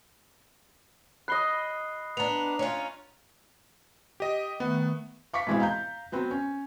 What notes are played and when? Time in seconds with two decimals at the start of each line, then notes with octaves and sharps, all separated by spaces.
1.28 D#5 B5 F#6 C7 G7
2.17 B3 D4 A#5 F7
2.59 C#4 F4
4.20 G4 D#5
4.60 D#3 A3 B3 F#5
5.33 F5 C#6 D6 B6 C#7
5.47 G#2 B2 E3 G#3 C4 E4
5.60 F5 A#5 G6
6.12 F#3 B3 C4
6.31 C#4